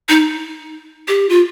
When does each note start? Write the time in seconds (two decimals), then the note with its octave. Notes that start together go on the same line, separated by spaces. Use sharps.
0.09 D#4
1.08 G4
1.29 F4